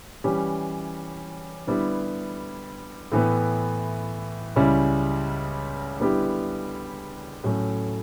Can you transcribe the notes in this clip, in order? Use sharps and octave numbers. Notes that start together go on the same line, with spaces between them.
E3 G3 C#4 G4
D3 G3 B3 E4 G4
A2 E3 B3
C#2 C#3 G3 C#4 E4
D3 G3 B3 E4 G4
A2 F#3 A3 C#4